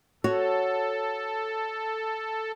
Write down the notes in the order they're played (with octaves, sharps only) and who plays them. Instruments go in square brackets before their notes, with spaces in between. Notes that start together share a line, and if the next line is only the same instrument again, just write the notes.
[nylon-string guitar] F#4 C#5 [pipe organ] A4